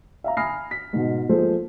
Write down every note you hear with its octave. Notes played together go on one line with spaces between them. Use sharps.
E5 F5 A#5
G#5 B5 D#6 F6 A#6 C7
B6
G#2 B2
F3 G#3 A#3 A4 C5